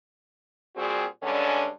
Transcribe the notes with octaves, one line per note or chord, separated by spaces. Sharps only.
A#2 G3 C4 F#4 G#4
G2 D3 G#3 C#4 D4